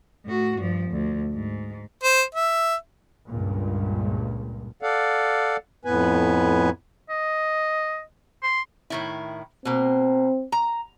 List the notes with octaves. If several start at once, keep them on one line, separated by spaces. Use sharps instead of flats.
A2 F#4
G2 F3
D2
G#2
C5
E5
C#2 G2 A#2
A4 D5 F5 F#5
F2 A2 B3 B4 G#5
D#5
C6
A2 D#3 E4
B2 A#3 C4
A#5